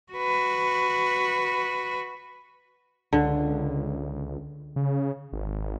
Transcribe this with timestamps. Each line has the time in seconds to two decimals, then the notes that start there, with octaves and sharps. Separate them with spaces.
0.13 F#4 B4
3.13 C#2 D3
4.76 C#3
5.33 G#1